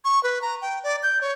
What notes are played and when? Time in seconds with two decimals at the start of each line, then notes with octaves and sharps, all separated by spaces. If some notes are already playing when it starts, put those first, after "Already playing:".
0.05 C#6
0.23 B4
0.42 A#5
0.61 G5
0.83 D5
1.03 G6
1.21 C#5